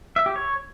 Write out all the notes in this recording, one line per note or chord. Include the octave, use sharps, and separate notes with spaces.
E5
G4
C#5